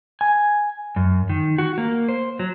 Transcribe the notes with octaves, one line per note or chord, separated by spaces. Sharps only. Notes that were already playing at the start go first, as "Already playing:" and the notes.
G#5
F#2
D#3
F#4
A#3
C5
F#3